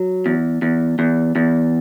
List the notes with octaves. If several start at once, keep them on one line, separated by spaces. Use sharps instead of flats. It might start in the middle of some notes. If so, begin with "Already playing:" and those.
Already playing: F#3
E2
E2
E2
E2